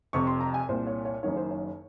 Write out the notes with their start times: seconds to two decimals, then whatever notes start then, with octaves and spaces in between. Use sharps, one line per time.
0.13 F1 F2 C3 C#6
0.27 C6
0.40 A#5
0.54 G#5
0.68 C2 A#2 C5
0.87 C#5
1.05 C#5
1.23 F#1 F#2 D#3 C#5
1.37 C5
1.50 C#5